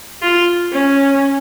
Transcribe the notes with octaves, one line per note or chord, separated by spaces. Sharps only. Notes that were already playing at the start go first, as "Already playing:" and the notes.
F4
C#4